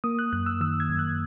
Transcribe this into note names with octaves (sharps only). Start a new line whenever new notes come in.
A#3 D#6
F#6
F#2 F#6
E6
D#3 E6
G#6
F#2
F#6